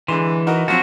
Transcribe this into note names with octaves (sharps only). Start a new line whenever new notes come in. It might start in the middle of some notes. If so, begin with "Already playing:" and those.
D3 E3 G#3 C6
D#4 F#4 A#4
F3 F#3 C4 F#4